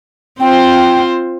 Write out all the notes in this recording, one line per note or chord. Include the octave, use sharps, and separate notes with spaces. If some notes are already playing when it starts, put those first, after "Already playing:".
C4 F4 C5 G5